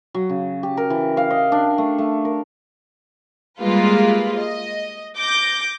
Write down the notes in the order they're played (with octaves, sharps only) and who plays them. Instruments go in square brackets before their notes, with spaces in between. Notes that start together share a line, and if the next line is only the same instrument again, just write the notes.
[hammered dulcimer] F#3
C#3
G4
A#4
E3
F5
D#5
D4
A3
A3
A#4
[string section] G3 G#3 A#3 F4 B4
D#5
D6 G6 A#6